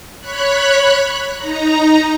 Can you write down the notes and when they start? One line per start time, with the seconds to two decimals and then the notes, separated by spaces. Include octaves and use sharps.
0.20 C#5 B5 F#6
1.38 D#4 A#5